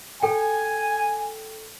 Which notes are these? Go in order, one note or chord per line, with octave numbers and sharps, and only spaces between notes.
A4 G5 G#5